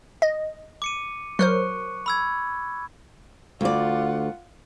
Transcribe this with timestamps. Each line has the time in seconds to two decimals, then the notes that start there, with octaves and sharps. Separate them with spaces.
0.22 D#5
0.82 D6 C#7 D#7
1.39 F#3 A#4 C5 C#6 F#6 C#7
2.06 B5 E6 G#6
3.61 D2 F4 D5 F#5